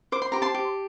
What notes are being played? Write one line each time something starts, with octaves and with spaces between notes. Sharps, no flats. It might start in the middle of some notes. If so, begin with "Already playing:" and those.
C5 D6
C6
G4 A#5
A5 C6
G4